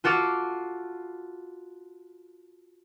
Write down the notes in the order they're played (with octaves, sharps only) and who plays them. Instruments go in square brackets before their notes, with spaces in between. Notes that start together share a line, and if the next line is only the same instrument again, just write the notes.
[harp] F4 F#4 A4 F5 D6